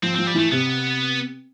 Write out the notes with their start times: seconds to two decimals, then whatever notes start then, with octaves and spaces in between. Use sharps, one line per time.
0.03 F3 C4
0.15 F3 C4
0.27 G3
0.35 E3 A3
0.51 C3 B3